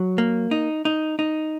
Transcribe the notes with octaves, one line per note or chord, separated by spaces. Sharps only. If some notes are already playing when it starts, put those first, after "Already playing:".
Already playing: F#3
A#3
D#4
D#4
D#4